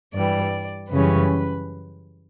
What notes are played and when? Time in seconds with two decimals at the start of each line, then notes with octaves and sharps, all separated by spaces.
0.13 G2 E3 G3 D5
0.91 F#2 C#3 E3 G3 C#4 B4